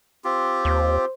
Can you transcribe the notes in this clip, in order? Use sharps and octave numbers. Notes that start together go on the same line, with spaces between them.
C4 F4 G4
D#2 C5